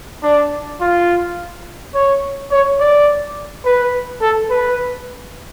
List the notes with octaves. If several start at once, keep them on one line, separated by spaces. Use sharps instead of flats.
D4
F4
C#5
C#5
D5
B4
A4
B4